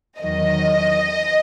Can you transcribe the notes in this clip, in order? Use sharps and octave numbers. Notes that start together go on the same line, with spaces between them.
E2 D#3 F#3 D#5